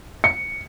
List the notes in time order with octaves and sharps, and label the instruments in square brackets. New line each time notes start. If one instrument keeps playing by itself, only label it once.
[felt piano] C#7